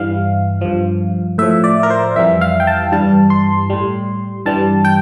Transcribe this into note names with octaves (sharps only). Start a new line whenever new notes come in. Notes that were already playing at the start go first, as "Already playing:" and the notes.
Already playing: G2 E3 G3 F5
G2 F3
A2 F3 E5
D5
A#4
C5
F2 E3 G3 E5
F5
G5
A5
G2 E3 G3 A5
C6
A2 G3
G2 E3 G3 A5
G5